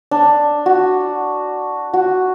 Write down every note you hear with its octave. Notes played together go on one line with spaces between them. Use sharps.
D4
F#4
F#4